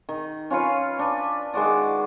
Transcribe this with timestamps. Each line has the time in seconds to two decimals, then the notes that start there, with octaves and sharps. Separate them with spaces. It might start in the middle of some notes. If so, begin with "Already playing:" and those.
0.09 D#3
0.50 C#4 F4 B4 C#5
0.99 D4 B4
1.54 D#3 G#3 F#4 D5